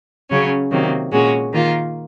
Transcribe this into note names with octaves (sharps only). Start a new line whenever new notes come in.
C#3 F#3 C#4
C3 D#3 F#3 A#3
A#2 G#3 C#4 F#4
D#3 A#3 F4